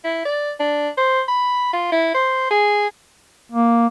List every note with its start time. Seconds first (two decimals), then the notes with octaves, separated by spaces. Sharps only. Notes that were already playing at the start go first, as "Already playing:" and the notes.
0.04 E4
0.25 D5
0.60 D4
0.97 C5
1.28 B5
1.73 F4
1.92 E4
2.14 C5
2.51 G#4
3.52 A#3